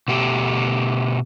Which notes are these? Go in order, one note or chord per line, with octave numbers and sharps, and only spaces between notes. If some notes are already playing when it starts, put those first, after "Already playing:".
B2 A3 G4